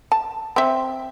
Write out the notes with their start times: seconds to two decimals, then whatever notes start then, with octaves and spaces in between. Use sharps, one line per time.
0.12 A5
0.56 C4 E5